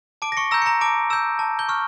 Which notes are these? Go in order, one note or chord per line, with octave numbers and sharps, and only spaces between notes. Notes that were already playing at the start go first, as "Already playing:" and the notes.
A5 D6 D7
A#6
C#6 C#7
A#5 E6 G6 A#6
C#7
A#5 A#6
A5 D6 D7
E6 G6 E7
A5
G6 G7
C#6 F6